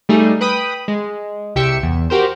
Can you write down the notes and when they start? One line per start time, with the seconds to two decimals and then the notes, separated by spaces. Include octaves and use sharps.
0.09 G3 A3 D#4 G#4
0.41 B4 G5 B5 D#6
0.88 G#3
1.56 C2 G4 E5 G5 C#7 E7
1.83 E2
2.10 F#4 G4 A#4 C5